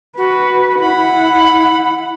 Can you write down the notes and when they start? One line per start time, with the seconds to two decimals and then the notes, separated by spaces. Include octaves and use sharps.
0.17 F#4 B4
0.80 E4 F#5 B5